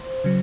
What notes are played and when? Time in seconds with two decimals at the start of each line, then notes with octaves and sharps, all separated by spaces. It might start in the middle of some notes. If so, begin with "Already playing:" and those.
Already playing: C5
0.24 C#3 F#3